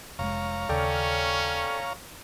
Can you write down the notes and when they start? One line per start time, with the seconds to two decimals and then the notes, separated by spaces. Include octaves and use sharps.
0.19 F1 G#2 G#3 C#5 F5 A#5
0.69 D#2 C#3 C#4 A4 D5 G5